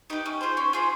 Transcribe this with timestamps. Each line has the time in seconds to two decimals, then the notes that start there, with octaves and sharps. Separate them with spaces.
0.10 D#4 G4 B4
0.26 C#4
0.41 F4 G#4 C5
0.57 C#4
0.73 F4 G#4 C5